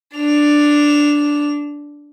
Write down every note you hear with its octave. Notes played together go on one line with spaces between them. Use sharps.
D4 F7